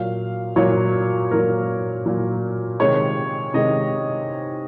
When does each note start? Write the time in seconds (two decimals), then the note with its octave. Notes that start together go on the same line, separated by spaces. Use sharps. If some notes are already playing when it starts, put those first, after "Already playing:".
Already playing: A#2 F#3 A#3 F5
0.56 A#2 F#3 A#3 C#5
1.31 A#2 F#3 A#3 A#4
2.06 A#2 F#3 A#3
2.80 C3 D#3 G#3 C#5
3.54 C3 D#3 G#3 D#5